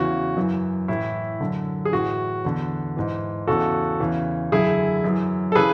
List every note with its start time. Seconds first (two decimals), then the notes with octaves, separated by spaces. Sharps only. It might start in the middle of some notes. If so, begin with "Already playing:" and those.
Already playing: E2 C#3 E3 F#4
0.37 F#2 E3
0.88 A2 E3 E4
1.41 F#2 D3
1.85 G#4
1.93 A2 E3 F#4
2.45 E2 D3
2.97 G#2 E3
3.48 E2 C#3 E3 F#4 A4
4.00 E2 C#3 E3
4.52 F#2 D3 E4 G#4
5.04 F#2 E3
5.52 A4
5.55 C#3 E3 G#4 B4